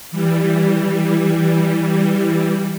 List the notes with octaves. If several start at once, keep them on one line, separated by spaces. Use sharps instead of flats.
E3 G3